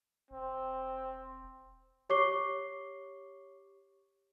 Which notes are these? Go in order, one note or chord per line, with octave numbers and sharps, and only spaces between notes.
E1 C4
G4 C#5 C#6 D6 C7 G7